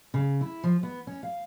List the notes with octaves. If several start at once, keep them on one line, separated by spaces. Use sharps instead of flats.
C#3
E4
F3
B3
C#4
F5